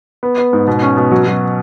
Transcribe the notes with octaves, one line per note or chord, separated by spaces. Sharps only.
B3
B3
G#2
B2
C#4
B2
F#3
F#3